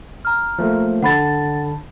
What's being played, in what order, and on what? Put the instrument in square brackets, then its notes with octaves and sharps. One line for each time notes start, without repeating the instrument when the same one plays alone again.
[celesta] A#5 F6
[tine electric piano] F3 A3 A#3
[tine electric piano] D3 A5 [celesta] F#5 B5 A6